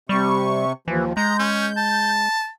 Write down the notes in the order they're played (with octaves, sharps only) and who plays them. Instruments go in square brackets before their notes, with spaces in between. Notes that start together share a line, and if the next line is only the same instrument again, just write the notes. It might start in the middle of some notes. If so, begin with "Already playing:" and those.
[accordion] C3 C#6 [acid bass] G3
[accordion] D#2 F3 [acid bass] E3
[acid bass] G#3 [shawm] A#5 [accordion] G6
[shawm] C#4
A5